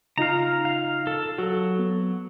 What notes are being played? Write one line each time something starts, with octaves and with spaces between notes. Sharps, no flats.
C#3 D#4 F4 F5 A#5
F5
A4
F#3 F#4 A4
B3